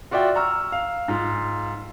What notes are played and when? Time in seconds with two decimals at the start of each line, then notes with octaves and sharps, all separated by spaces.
0.11 F4 F#4 D5 E5 G5
0.36 A#5 C#6 E6 F6
0.72 F5
1.08 G#2 F4 F5